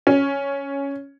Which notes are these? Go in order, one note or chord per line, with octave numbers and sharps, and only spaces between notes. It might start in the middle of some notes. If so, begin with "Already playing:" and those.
C#4